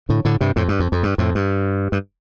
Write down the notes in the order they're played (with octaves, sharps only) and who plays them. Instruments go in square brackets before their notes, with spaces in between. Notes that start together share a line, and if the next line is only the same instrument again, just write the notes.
[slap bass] A2 D3
A2 D3
G2 C3
F2 A2
G2
F2
F2
G2
F2 A2
G2
G2